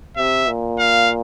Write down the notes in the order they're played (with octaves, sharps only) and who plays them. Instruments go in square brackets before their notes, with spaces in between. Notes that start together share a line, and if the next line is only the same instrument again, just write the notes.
[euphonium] C3 [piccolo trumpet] E5
[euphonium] A#2
[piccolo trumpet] F5